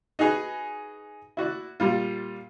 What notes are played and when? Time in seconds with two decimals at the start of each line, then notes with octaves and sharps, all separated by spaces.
0.19 D#4 F#4 G#4 B4
1.37 E4 F#4 D5
1.80 A#2 G3 F4